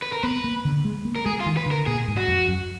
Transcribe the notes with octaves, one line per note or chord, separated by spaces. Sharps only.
B4
A#4
B3 B4
A#3
D3
G#3
A#3
A#4
G#3 G#4
F4
D#3
B4
D3
A#4
A#2 G#4
G#2
F#4
F2
F#2